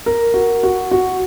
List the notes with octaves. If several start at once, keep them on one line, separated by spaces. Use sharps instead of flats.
A#4
F#4
F#4
F#4